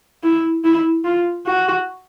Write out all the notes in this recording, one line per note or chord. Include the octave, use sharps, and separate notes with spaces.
E4
E4
F4
F#4